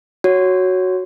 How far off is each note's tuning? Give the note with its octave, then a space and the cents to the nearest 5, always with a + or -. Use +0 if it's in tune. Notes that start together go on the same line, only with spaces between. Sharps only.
F#4 +0 C#5 +0